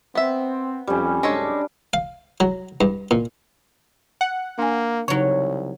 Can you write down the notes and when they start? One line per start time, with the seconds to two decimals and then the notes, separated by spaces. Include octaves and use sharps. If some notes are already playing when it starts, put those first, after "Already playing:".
0.15 B3 C4 E5
0.87 F2 G3 C#4
1.23 C2 F#2 G#3 D4 A4 C#5
1.93 F5
2.40 F#3
2.81 G2
3.11 A#2
4.21 F#5
4.59 A#3 D4 G#5
5.08 C2 C#3 F#3 D#4 C#5